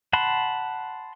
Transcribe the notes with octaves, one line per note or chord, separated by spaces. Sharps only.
F#5 A5 B5 C6